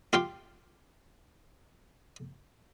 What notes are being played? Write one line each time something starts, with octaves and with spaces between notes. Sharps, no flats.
F4 G4 F5 G5 C6